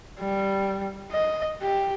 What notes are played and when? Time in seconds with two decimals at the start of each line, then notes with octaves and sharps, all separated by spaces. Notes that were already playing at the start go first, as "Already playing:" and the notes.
0.20 G3
1.12 D#5
1.62 G4